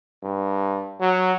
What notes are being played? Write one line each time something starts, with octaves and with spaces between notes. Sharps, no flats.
G2
F#3